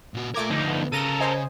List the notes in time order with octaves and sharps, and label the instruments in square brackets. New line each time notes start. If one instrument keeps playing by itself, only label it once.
[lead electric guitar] A#2 F#4
[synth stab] A3 D6 G#6 [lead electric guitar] F4 A#4
[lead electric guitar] D2 [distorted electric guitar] F3 D#4
[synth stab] B3
[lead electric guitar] C#3 [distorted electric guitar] A4 A#4 [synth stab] A#6 D#7
[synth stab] C5 D#5 G#5